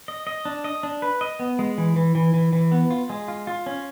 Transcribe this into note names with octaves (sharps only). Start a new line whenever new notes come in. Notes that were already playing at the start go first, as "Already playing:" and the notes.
D#5
D#5
D4
D#5
D4
B4
D#5
B3
G#3
E3
E3
E3
E3
E3
B3
F4
G#3
F4
F4
C#4